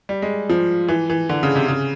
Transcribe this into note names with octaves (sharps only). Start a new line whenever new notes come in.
G3
G#3
F3
E3
E3
D3
C#3
C3
C#3